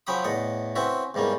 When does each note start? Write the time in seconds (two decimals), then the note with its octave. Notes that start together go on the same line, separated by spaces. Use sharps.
0.07 F3 F#3 C#4 G5 B5 D#6
0.24 E2 A2 D#5 F#5
0.76 C4 C#4 E4 F#4 B4
1.14 E2 G#2 G3 A#3 C#4